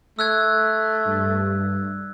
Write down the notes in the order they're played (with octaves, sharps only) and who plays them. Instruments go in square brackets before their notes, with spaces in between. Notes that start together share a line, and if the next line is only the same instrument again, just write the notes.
[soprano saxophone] A3 [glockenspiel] E6 F#6 G#6
[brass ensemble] G2